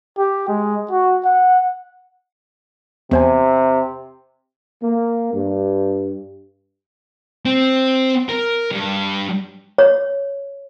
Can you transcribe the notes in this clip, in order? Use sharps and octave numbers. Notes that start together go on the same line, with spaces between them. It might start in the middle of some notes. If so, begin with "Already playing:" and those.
G4
G#3
F#4
F#5
E2 C3 C5 G#5
A#3
G2
C4
A#4
G2
C#5